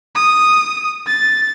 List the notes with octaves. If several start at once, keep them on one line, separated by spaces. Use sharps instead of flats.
D#6
A6